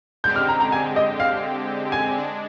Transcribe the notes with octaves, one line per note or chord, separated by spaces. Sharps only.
D3 G#3 C4 G4 G6
F6
A#5
A#5
G#5
D#5
F5
G#5
G#3 D4